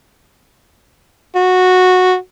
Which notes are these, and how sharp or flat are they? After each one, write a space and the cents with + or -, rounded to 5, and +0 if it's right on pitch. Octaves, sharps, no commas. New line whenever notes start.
F#4 -10